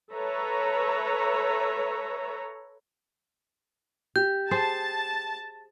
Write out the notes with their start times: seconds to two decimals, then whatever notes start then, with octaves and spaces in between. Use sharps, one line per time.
0.13 A4 B4 C#5 E5 A#5
4.16 G4 G6
4.51 G#4 C5 A5